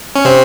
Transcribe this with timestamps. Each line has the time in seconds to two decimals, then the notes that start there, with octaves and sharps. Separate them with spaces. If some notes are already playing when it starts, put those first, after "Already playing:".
0.16 C#4
0.25 C3 C4